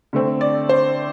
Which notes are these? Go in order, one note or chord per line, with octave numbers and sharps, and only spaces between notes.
D3 A3 C4
D5
C5